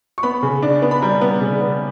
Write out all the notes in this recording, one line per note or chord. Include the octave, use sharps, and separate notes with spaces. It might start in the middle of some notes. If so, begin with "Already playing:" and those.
C#6
B3 B5
C#3
D4
B3
B5
G3 A#5
B3
C#3
B3